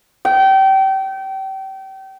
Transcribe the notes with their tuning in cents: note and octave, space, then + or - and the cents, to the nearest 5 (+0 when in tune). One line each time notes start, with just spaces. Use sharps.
G5 -30